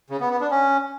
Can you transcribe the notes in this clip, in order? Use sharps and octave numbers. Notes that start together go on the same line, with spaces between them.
C#3
B3
B3
D4
C#4